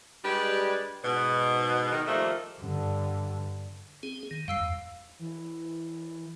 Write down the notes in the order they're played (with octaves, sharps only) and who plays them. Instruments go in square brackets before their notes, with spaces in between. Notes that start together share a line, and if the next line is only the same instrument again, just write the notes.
[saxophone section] G3 G#3 D4 G4 B4
G#2 B2
D#3
D#3 F3 G3 A3 A#3
[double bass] G2 D3
[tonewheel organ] C4 G#4 [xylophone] D#7
[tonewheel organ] D#3
[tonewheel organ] F#2 G3 [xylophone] F5 E6 C7
[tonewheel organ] E2
[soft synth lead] E3